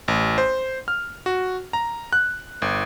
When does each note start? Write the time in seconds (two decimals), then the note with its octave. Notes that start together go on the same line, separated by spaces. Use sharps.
0.08 A1
0.38 C5
0.88 F6
1.26 F#4
1.73 A#5
2.13 F#6
2.62 G1